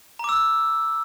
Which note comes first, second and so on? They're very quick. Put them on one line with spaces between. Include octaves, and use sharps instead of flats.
A#5 D6 E6